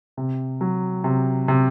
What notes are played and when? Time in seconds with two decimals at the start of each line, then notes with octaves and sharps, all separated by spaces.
0.17 C3
0.61 F#3
1.04 C3
1.48 C3